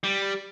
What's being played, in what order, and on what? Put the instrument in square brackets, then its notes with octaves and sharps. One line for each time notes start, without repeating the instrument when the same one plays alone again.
[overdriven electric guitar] G3